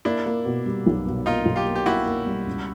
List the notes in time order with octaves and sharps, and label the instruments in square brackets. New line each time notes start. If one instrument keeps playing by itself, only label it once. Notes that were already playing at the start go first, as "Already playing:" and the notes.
[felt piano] A#3 [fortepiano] D4 E4
[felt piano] A#3
B2
G3
B1
B2
[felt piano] A#3 [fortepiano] D#4 F4
[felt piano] B1
[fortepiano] F4 G4
[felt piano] A#3
[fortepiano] G4
[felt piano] A#3 [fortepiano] E4 F#4
[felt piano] A#3
G3
C#2